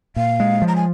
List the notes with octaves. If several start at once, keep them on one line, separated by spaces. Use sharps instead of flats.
A#2 F5
G#3
F3
A#5
G#5